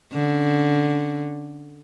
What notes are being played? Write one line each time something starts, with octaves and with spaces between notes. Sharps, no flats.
D3 C#4